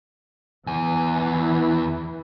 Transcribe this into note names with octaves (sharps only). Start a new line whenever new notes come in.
E2 E3 G#5